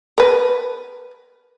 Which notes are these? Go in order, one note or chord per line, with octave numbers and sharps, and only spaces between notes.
A#4 B4